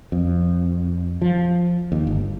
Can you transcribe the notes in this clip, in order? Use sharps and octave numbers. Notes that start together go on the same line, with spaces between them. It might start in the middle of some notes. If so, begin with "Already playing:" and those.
F2
F3
D#2
G1